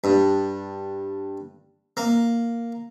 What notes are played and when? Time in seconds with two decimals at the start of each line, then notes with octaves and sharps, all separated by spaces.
0.04 G2
1.97 A#3